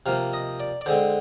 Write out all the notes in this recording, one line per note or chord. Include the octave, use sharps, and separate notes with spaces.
C3 F3 A#3 F5
D#5
D5
D5
D3 G#3 C4 C5